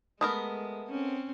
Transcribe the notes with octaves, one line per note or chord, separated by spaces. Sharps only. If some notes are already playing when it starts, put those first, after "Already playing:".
G#3 A3 B3 A#4 D#6
C4 C#4